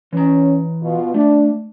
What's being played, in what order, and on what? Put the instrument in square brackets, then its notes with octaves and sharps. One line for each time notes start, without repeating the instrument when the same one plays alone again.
[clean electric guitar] E3 A#5 [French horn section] C#4
[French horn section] B2 F4
[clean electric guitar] A3 [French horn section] D4